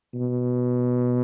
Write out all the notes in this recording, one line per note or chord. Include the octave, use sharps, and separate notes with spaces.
B2